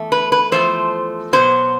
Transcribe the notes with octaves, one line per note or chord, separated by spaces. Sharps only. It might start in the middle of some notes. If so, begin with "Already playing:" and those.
Already playing: E2 A3
B4
B4
E2 C#3 F3 A3 C5
B2 F#3 B3 C5